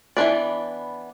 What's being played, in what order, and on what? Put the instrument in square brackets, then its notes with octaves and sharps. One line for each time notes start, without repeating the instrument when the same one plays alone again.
[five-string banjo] E3 B3 D4 B4 D5